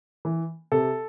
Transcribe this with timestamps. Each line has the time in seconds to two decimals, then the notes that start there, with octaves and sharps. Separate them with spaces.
0.25 E3
0.72 C3 A4